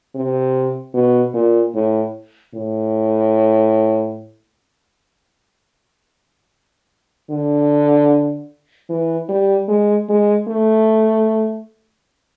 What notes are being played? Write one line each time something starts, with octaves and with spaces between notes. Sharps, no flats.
C3
B2
A#2
A2
A2
D3
E3
G3
G#3
G#3
A3